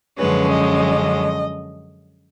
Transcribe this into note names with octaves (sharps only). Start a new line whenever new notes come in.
F#2 D3 F3 G#3 C#4 B4
D#5